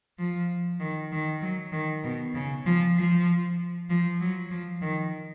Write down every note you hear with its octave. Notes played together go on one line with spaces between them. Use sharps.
F3
D#3
D#3
F#3
D#3
B2
C#3
F3
F3
F3
F#3
F3
D#3